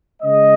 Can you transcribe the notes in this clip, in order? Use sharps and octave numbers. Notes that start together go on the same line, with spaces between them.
C#3 G#3 D#5